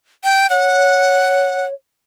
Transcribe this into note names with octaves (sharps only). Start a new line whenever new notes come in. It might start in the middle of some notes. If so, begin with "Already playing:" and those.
G5
C#5 F#5